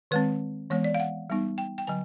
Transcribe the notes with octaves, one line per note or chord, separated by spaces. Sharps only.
D#3 G#3 C4 B4
E3 G#3 B3 C#5
D5
F5
F#5
G3 B3 D#4
G5
G5
D3 F#3 G#5